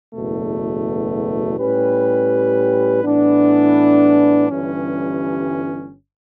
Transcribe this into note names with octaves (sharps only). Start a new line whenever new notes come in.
F#1 E2 B2 A3
A2 G3 C#4 G4 B4
A2 E3 B3 D4
G1 G2 E3 G3 C#4